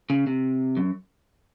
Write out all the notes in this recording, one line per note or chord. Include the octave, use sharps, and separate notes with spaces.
C#3
C3
F#2